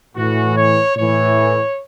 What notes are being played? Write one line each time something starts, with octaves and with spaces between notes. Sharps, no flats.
A2 E3 F#4
C#5
A2 E3 C#5